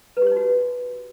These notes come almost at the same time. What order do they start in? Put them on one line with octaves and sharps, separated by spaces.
B4 G4 C#5 D#4 F#4